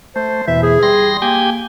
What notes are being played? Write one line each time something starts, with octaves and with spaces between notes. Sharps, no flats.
A3 C5
E2 B2 E3 E5
G#4
G3 C6 A#6
A#3 G4 G5 G#5